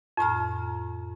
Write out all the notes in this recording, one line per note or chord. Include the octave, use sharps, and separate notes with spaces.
F2 A2 A#5 F6